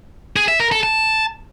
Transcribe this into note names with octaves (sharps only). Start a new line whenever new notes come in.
G#4
E5
A#4
A4
A5